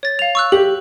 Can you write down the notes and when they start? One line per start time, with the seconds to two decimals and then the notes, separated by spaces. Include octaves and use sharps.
0.03 C#5 A6
0.19 F5 F7
0.35 C#6 E6 F#6
0.52 G4 F#7